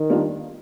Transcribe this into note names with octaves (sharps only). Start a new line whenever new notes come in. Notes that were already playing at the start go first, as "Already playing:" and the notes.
Already playing: D#3
G3 A#3 D4 F4